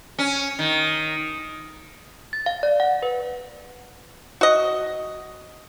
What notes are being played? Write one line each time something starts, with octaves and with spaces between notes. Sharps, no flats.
C#4
D#3
A6
F5
D5
F#5
B4
F#4 D#5